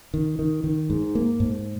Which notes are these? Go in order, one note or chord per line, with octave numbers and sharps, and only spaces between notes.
D#3
D#3
D#3
G#2
A#3
G#2